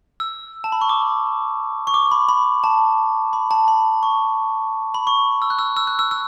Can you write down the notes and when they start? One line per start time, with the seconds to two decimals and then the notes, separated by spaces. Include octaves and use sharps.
0.20 E6
0.64 A5
0.72 B5
0.81 C#6
0.89 D6
1.87 C#6
1.94 D6
2.11 B5
2.29 B5
2.64 A5
3.33 B5
3.51 A5
3.68 B5
4.03 C#6
4.94 B5
5.07 C#6
5.42 E6
5.50 F#6
5.59 E6
5.77 E6
5.87 F#6
5.99 E6
6.11 E6